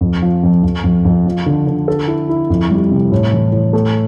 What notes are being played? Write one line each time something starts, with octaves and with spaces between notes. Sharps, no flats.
F2
F3
F2
F2
F2
F2
F3
D3
D3
A4
E4
E4
F2
G3
C3
A2
E3
A2
A3